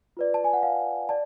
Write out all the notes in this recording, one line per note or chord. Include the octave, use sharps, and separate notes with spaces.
F4 B4 D5
A5
G#5
F#5
F5
D5 A5